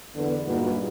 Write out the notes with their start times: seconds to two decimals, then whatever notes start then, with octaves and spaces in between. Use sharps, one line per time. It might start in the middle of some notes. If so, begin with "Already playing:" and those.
0.15 E2 D3 B3
0.46 G2 A#2 G#3 D#4 F#4 B4